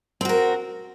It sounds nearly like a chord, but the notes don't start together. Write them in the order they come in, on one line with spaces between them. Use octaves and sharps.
C4 F#4 A#4